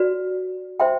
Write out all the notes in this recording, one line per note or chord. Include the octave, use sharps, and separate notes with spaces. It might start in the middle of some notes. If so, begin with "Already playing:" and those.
Already playing: F#4 B4 D5
C5 E5 G5 C6